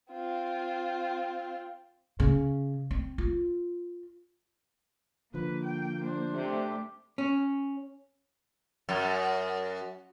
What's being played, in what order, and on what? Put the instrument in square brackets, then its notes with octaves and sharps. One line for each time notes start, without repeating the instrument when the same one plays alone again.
[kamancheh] C4 F4
[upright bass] C#3
C4
F4
[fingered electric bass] D3 F3 [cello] A#3 [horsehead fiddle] B4
[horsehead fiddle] G5
D4 C5
[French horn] C3 [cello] A3 G4
[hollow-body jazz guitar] C#4
[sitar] F#2